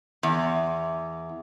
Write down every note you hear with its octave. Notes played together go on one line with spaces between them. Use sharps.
E2